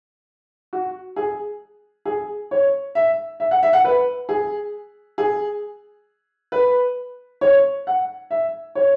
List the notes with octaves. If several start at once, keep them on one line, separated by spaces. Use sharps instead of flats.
F#4
G#4
G#4
C#5
E5
E5
F#5
E5
F#5
B4
G#4
G#4
B4
C#5
F#5
E5
C#5